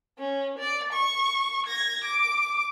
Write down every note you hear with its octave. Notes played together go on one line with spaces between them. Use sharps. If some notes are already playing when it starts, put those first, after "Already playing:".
C#4
D5
C#6
G#6 A#6
D6